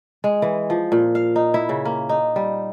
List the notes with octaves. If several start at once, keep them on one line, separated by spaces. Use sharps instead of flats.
G#3
E3
F3
A#2
F5
D#4
E4
C#3
A#3
D#4
G3